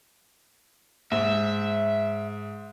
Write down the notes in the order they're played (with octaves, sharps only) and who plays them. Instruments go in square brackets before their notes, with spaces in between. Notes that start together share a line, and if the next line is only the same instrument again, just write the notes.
[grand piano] G#2 [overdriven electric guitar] E5